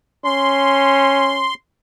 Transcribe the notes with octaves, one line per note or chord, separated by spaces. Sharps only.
C#4 C6